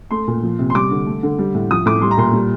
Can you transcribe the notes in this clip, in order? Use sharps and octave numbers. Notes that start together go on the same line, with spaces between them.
A3 C6
A#2
F3
C3
C6
G3 D6
D3
A3
D3
G3
A2
F3 D#6
A2 D6
G3 C6
A#5
A#2 C6
G3